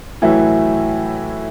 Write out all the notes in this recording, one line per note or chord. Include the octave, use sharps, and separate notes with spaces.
A2 E3 F#3 E4